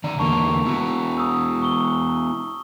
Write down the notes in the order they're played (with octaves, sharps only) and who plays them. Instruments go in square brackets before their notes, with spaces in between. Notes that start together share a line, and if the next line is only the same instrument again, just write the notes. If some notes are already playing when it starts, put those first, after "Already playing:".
[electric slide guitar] D#3 D5 [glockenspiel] A#5
[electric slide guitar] E2 D3 A#3 [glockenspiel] A5 C#6 F7
[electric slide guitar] B3 E4 F#4
[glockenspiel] D#6 E6
C#6 D#6 G7